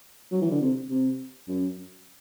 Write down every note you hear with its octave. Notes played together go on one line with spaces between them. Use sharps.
F#3
E3
D3
C3
C3
F#2